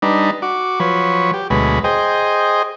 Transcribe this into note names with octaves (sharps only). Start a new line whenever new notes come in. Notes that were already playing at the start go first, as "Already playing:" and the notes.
G3 D4 D#4 B4
F#4 D6
F3 F#3 B4 C#5
G4
D2 B2 F#3 G#3 B4
G#4 C5 D#5 G5